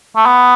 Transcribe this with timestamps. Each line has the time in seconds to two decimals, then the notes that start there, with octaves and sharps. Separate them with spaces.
0.16 A3
0.26 B3